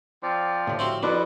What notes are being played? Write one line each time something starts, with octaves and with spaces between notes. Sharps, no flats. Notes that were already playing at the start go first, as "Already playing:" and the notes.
F3 C4 D5
A2 D3
C4 F#4 G4 E5
F2 D4 E4 F#4 B4 D6